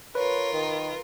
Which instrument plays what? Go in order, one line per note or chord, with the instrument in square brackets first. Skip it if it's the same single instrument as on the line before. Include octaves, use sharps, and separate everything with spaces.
[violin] F4 A#4 [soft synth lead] B4 [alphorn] C#5
[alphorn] D#3